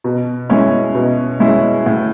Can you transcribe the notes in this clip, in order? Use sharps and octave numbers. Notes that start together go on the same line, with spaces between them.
B2
G#3 C#4 E4
B2
G#3 C#4 E4
A2